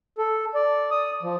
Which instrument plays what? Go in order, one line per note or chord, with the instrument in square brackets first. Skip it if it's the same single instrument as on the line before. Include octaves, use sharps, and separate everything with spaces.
[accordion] A4
D5
D#6
F3